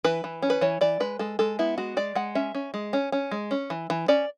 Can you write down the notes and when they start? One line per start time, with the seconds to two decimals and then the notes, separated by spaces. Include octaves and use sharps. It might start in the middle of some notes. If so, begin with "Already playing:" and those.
0.04 E3 B4
0.24 E3
0.42 C#4
0.50 B4
0.61 E3 C#5
0.81 E3 D5
1.00 G#3 B4
1.19 G#3 A4
1.39 G#3 A4
1.59 B3 E4
1.78 G#3 F#4
1.97 G#3 D5
2.15 G#3 F#5
2.35 C#4 E5
2.55 C#4
2.74 G#3
2.93 C#4
3.12 C#4
3.31 G#3
3.51 C#4
3.70 E3
3.90 E3
4.08 C#4 D5